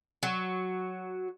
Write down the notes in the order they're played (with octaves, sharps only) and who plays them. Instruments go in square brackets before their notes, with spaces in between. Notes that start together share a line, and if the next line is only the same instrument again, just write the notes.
[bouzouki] F#3